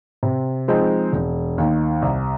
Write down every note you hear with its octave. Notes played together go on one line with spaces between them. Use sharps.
C3
F3 G#3 C4 D#4
E1
D#2 D#3
C2